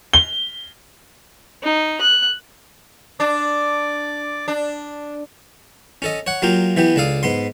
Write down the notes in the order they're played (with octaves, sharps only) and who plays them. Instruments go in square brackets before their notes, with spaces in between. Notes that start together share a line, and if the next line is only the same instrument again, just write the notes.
[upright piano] G7
[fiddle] D#4
F#6
[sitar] D4 [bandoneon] D5 D6
[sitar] D4
[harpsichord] C#4 A4 D#5
C#5 F#5
F#3 A#3 F4 G4
E3 B3 G4
C#2 D4 A4 F5 D#6
G#2 B3 C6